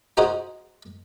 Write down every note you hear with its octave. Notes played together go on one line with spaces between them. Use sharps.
D#4 F4 F#4 G#4 C5 D#5